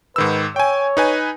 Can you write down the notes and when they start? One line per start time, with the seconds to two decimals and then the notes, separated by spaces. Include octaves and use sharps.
0.16 G#2 D#3 B4 E6
0.56 C#5 G5 G#5
0.97 D#4 B4 G#5